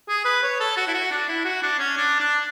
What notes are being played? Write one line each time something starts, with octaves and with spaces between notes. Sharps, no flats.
G#4
B4
C#5
A4
F#4
E4
F#4
D4
E4
F#4
D4
C#4
D4
D4